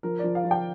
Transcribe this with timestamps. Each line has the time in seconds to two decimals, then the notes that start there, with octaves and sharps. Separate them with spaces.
0.03 F3 A#4
0.19 F3 D5
0.35 F5
0.44 F3
0.51 G5